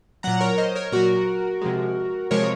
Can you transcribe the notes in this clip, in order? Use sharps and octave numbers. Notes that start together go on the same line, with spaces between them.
A#2 F#3 F#5 A#5
A#4 C#5
C5 D#5
A#4 C#5
A#2 F#3 F#4 A#4
C3 F3 G#3
C3 F3 G#3 A#4 C#5